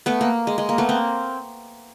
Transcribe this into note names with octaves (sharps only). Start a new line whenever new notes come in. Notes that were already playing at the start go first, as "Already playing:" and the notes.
A3 B3
A#3
G#3
G#3
A#3
A3 B3
A#3 C4